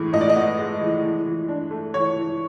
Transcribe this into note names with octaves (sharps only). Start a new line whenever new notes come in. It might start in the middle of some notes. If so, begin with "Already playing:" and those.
Already playing: A2 E3 G#3
A2 D#5
D5
D#5
B3
G#3
E3
E3
E3
D4
A3
E3 C#5
E3